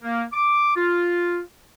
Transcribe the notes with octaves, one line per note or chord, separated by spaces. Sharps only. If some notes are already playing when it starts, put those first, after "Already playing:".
A#3
D6
F4